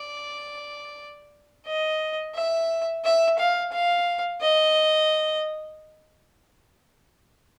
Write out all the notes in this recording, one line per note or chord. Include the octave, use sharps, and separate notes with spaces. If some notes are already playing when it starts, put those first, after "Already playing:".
Already playing: D5
D#5
E5
E5
F5
F5
D#5